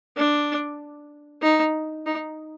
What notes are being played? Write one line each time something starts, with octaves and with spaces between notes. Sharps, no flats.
D4
D#4
D#4